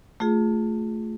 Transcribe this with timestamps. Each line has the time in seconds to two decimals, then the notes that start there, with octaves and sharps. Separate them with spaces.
0.20 A3 F4 G#4